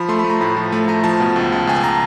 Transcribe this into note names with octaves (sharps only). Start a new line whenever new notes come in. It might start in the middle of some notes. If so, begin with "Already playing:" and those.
Already playing: F3 B5
A3 C6
B5
A3
A#5
A2 B5
F3
A3
A3 A#5
F3 A5
B2
C#2
C#2
C#2 G#5
A5
A#5